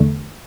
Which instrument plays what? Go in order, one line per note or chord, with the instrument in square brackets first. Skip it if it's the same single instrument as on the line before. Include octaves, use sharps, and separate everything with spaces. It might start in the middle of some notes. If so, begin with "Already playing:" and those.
Already playing: [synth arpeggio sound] E2 D3 A3